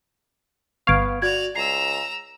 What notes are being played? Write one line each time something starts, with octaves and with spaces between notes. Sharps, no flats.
G1 B3 F5 C#6 G#6 D7
F#4 D5 G#6 F7
C#2 A#5 E6 C7